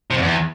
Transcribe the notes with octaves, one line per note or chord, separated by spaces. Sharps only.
C3
F2
E2